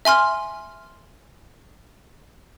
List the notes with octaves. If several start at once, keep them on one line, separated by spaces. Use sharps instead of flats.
E5 G#5 C6 F6